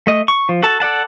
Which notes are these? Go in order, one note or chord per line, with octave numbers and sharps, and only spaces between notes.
A3 D#5
C#6
F3
F#4 A4 A5
A4 D5 F#5 A5